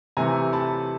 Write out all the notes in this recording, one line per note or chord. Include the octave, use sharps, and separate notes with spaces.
C3 E3 A3 G#5 A#5
A5 B5